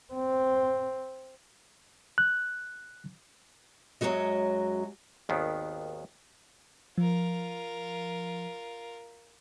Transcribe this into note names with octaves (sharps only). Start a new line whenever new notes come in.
C4
F#6
F#2 F#3 G#3 A3 F#4 D#5
G#1 D#2 D#3 B3
F3 F4 A#4